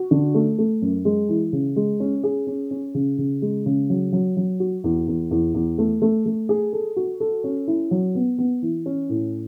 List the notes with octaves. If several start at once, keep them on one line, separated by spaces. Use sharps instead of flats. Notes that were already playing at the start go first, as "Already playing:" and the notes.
Already playing: F#4
D3
A3
A3
F#2
G#3
E3
C#3
G#3
C#4
G#4
C#4
C#4
C#3
C#3
G#3
C#3
F#3
F#3
F#3
F#4
E2
E2
E2
E2
A3
A3
A3
G#4
A4
F#4
A4
C#4
E4
F#3
B3
B3
E3
C#4
A2